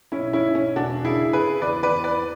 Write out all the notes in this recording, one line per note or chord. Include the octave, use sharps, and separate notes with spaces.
C#4 E4
B1
C#4 E4
B1
C#4
E1 D4 F#4
C#3 E4 G#4
C#3 G#4 B4
E2 B4 D5
B4 D5
E2
B4 D5